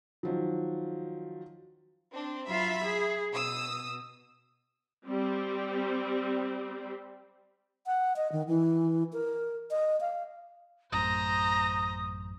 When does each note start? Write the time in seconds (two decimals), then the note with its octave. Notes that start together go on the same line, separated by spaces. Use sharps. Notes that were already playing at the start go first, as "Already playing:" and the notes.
0.23 D#3 F3 F#3
2.13 C4 D4
2.48 F#3 F4 E5 B5
2.86 G#4
3.33 B2 D#6 E6
5.06 G3 C4
7.86 F#5
8.16 D#5
8.32 D#3
8.48 E3
9.13 A#4
9.71 D#5
10.01 F5
10.92 A1 F#2 A2 C5 A#5 D#6